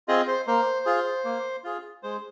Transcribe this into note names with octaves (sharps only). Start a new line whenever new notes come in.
C4 F4 G#4 D#5
C5
A#3 C5
F4 G#4
A#3
F4 G#4
G#3 C5